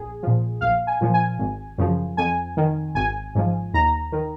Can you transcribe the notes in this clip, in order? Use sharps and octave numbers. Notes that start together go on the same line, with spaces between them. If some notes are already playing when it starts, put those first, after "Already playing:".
Already playing: A#1 G#4
A#2 F3
A#1 F5
G#5
A#2 F3
G#5
G#1
F#2 C#3 F3
F2 G#5
D#3
G#1 G#5
G#2 F3
D#2 A#5
D#3